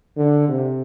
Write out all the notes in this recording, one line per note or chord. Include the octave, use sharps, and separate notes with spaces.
D3
C3